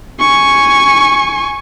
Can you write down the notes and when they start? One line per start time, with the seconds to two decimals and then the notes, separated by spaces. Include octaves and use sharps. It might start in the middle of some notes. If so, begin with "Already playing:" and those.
0.20 G#5 C#6